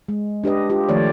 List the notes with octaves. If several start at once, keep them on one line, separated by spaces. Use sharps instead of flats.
G#3
D4 G4 B4 D#5
F4 G4
D#3 F3 A3 C#5 D5